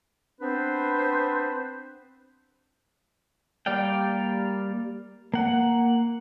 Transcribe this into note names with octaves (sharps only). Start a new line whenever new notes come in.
B3 C4 D4 B4 C5
G3 A#3 D5 F5 G5
A#3 F#5